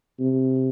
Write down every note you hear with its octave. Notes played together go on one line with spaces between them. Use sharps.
C3